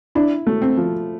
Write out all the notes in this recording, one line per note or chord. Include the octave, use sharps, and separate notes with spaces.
D4 E4
A3
C4
F3